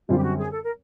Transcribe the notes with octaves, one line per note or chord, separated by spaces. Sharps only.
F#2 D3 G3 C4 F4
G4
F#4
G#4
A4
A#4